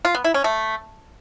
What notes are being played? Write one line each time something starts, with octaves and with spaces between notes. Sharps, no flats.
F4
B3
E4
C#4
A3